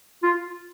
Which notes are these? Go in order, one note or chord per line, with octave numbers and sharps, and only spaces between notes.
F4